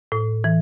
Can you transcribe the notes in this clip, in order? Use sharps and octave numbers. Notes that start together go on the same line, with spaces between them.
A2
E3